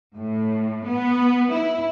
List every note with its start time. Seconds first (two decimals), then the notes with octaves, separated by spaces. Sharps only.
0.16 A2
0.87 B3
1.52 E4